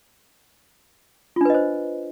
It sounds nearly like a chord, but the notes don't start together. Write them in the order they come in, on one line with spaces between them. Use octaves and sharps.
F4 D4 B4 D#5 C5